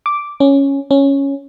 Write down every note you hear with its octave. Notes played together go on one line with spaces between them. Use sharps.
D6
C#4
C#4